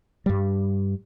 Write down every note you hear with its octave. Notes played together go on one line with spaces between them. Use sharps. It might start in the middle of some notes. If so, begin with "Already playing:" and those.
G2 G3